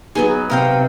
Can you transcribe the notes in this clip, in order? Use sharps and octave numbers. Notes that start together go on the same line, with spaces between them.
F#3 B3 D#4 G#4
C3 A#4 F5 G5